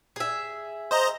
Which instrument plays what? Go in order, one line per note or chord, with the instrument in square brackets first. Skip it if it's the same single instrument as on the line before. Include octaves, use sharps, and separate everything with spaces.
[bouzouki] G#4 E5
[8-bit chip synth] C5 D#5 A#5